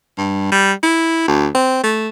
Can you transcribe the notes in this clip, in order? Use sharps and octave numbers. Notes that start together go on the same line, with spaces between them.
G2
G3
E4
D2
C4
A3